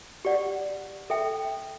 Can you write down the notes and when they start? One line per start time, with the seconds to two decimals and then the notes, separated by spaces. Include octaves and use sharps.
0.25 G4 D5 F#5
1.10 A4 E5 G5